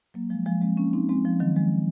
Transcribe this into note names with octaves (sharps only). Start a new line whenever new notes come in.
F#3 A#3
F3 G#3
F3 G#3
G#3 C4
A#3 C#4
C4 D#4
G#3 C4
F3
D#3 F#3
F3 G#3